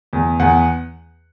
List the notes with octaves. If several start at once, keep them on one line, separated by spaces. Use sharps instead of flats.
E2
E2 F#5